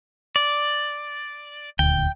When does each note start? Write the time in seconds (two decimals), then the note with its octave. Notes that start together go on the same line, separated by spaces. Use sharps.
0.36 D5
1.79 D#1 D2 G5